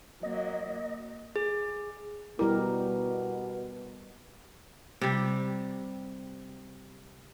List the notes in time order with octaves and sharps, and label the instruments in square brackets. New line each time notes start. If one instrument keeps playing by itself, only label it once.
[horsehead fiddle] F#3 A#3 [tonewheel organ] D#5
[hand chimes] G#4
[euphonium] B2 [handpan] G3 G4 A#4 [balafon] E4
[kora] C3 G3